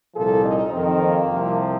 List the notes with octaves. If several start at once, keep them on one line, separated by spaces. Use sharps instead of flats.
C2 A#2 F3 A4
D#4
F2 D#3 C4
A#3
C2 C3 F3